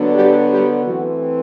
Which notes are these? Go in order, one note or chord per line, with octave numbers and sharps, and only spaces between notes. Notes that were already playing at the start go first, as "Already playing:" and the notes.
Already playing: D3 F#3 B3 D4
G3 G4
G3 G4
E3 A3 C4 F#4